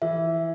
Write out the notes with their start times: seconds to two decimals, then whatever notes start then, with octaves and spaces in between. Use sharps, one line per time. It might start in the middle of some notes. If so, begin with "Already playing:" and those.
0.02 E3 E5